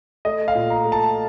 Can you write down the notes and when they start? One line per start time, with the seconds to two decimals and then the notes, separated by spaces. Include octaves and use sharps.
0.25 A3 D#5
0.48 F5
0.55 A#2
0.70 A#5
0.85 A3
0.92 A5